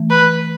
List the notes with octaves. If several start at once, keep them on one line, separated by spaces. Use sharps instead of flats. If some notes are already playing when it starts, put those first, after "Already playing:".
Already playing: E3 A3
B4